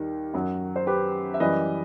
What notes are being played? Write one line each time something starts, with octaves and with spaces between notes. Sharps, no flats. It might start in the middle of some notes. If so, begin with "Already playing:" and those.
Already playing: D#2 D#3 G3
F#2 F#3
C5
G4 B4
E5
F#2 E3 G3 B4 D#5